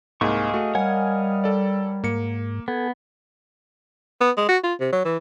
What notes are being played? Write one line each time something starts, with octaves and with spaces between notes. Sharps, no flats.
C2 G#2 A#3 G#4 D#5 F5 C#6
A3 F#4
G3 A#4 C#5 F#5 G#5
A4 D5
G#2 A#3 C#7
B3 A4 G#5
B3
G#3
F#4
F4
C3
F#3
E3